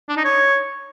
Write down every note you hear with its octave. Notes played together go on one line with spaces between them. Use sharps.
D4
D#4
C#5